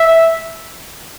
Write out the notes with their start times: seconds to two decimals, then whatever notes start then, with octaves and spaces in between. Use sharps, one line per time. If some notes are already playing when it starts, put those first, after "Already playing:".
Already playing: E5